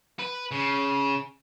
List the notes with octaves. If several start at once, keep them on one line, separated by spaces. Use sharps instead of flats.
B4
C#3